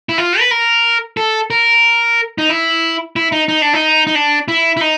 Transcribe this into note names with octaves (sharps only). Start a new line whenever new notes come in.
E4
F4
B4
A#4
A4
A#4
D#4
E4
E4
D#4
D#4
D4
D#4
D#4
D4
E4
E4
D#4